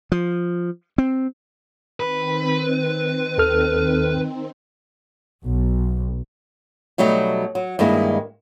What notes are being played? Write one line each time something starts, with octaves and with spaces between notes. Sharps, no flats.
F3
C4
D#3 C4 B4
D#2 A4 F6
B1
B2 F#3 G3 A3 D#4
F#3
G2 D#3 G#3 A#3 E4